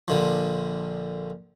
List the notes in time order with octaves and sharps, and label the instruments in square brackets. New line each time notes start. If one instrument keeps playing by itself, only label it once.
[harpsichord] A#1 D3 F3